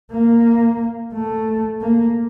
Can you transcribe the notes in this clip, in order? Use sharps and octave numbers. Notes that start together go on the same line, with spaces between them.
A#3
A3
A#3